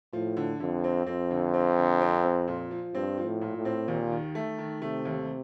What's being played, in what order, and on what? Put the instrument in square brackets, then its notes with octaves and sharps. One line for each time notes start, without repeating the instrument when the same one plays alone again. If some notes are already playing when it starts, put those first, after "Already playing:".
[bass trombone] A2 [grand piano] F3
[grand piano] D3
[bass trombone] F2 [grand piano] D3
[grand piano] C4
[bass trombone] F2 [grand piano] C4
[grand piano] D3
C4
D3
C4
C4
A#2
F3
[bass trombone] G2 [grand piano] C4
[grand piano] F3
[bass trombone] A2
[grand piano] A#2
[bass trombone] A2
[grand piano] C4
[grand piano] D#2 [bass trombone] A#2
[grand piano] D#3
A3
D#3
[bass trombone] C3 [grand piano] A3
[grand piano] D#2